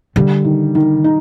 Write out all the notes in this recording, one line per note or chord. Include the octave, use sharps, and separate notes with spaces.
D3 G3
D#3
D#3
D#4